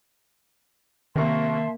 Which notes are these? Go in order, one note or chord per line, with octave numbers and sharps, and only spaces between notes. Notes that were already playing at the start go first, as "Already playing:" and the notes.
C3 D#3 A#3 A#4 E5 A5 C6 C#6